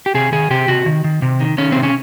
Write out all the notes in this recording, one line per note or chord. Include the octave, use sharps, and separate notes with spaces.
G4
C3 G#4
D#3 G#4
C3 G4
C3 F#4
D#3
D#3
C3
D#3
D#3 C#4
C3 C4
C#4